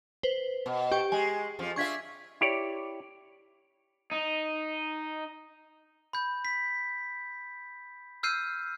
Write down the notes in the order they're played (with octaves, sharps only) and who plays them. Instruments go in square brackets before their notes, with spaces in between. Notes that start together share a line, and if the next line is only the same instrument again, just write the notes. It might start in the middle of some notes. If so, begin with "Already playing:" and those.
[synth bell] B4 C5
[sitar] B2
[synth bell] G4 G5 C#6
[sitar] G#3 [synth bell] G#5
[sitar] F2 F3
[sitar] D4 F4 E5 [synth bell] C#6 G#6 B6
[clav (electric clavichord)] E4 G4 C#5 D5
[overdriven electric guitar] D#4
[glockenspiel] B5 G6
B6
E6 F6 G6 C7 D#7